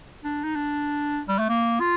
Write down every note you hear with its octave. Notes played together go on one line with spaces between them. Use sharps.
D4
D#4
D4
G3
A3
A#3
F4